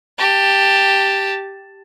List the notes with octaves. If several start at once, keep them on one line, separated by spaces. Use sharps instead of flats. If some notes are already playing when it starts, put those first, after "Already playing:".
G4 A5